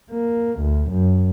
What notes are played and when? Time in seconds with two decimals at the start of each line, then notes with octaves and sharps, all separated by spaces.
0.11 A#3
0.61 D2
0.91 F#2